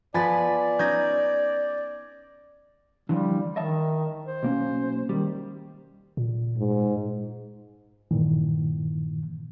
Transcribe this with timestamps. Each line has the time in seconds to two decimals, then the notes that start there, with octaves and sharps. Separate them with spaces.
0.14 F3 B3 B4 D5 G#5 B5 A6
0.79 C#4 D#4 G6 G#6 A#6
3.09 D3 E3 F3 G3
3.56 D#3 D#5 E5 A5
4.25 C5
4.43 B1 A#3 C#4
5.09 D#3 G3
6.17 A#2
6.57 G#2
8.11 G2 A#2 D#3 E3